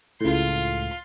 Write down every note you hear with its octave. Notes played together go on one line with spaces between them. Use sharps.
C#2 A2 F4 C6